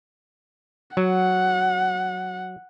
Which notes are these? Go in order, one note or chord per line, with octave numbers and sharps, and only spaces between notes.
F#3 F#5